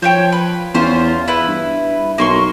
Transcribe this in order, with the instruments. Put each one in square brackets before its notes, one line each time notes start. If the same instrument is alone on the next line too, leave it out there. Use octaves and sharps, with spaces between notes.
[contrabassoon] F3 [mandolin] C5 C#5 G5
[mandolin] B4
[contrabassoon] E2 [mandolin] C#4 F4 C5
[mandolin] E4 B4
[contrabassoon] G2
[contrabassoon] B1 [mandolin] A#3 C6 C#6